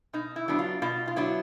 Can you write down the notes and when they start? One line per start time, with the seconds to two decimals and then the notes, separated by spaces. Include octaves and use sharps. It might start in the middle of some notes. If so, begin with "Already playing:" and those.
0.13 B2 D#4
0.36 E4
0.48 F#3 B3 D4
0.59 F4
0.82 B2 F4
1.07 F4
1.16 F#3 B3 D4 E4